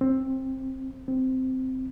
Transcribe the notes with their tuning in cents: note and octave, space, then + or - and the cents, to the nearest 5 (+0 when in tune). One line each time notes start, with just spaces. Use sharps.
C4 +15
C4 -10